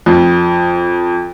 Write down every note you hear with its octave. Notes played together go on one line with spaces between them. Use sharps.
F2